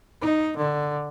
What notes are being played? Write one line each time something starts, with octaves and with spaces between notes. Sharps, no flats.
D#4
D3